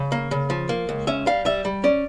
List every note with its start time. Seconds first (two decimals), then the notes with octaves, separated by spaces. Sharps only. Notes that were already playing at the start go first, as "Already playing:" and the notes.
Already playing: C#3
0.12 A#3
0.31 C#3
0.50 F3
0.69 A#3
0.89 C#2
1.07 C#4 E5
1.27 G3 F5
1.45 G3 E5
1.65 G3
1.84 C#4 D5